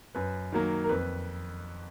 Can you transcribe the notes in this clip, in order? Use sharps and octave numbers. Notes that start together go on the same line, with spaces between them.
F#2 B4
D#3 F#3 A#3
A#4
F2 B4